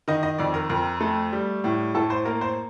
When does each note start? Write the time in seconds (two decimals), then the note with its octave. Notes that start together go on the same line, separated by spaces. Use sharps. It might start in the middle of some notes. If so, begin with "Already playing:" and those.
0.08 D#3 D#5
0.23 D#5
0.38 F2 D5
0.54 A#4
0.69 F2 A#4
1.01 A3
1.33 G3
1.64 A2
1.94 A2 A4
2.10 C5
2.25 A#3 A#4
2.41 C5